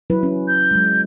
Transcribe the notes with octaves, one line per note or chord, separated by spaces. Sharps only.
F#3 E4 B4
C#4
G6
F#3 G#3